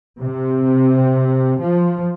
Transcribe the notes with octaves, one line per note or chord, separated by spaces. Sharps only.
C3
F3